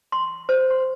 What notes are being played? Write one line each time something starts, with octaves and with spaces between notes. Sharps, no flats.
C6
C5
C6